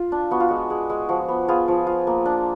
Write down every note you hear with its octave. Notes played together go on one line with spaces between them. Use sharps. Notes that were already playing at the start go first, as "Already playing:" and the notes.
Already playing: F4
D4
B3 F#4
F4
G#3 F#4
G#3
G#3
F3 F#4
B3
B3 F4 G#4
F3
F4
A#3
D4